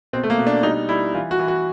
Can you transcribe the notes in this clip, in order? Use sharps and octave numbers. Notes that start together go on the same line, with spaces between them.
B2 C4
A3
A#3
B2
D4
G3 D#4
G3 E4
E3 F4
F#4
E3
F#4